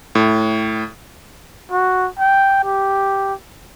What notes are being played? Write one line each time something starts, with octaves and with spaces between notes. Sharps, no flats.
A2
F#4
G5
G4